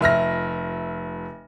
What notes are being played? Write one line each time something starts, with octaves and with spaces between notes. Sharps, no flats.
F1 E5 F6 A#6